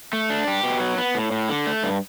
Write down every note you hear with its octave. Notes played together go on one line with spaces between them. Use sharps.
A3
D4
G4
B2
F#3
B3
A2
A2
D3
A3
G2